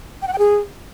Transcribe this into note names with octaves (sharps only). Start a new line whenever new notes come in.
G5
F#5
G5
G#4